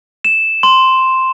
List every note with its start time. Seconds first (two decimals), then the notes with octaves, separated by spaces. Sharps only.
0.25 E7
0.63 C6